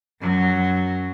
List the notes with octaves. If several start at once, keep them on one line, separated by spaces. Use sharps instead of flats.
F#2 F#3